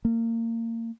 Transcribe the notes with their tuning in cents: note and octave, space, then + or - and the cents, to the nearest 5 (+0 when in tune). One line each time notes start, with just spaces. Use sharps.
A#3 -30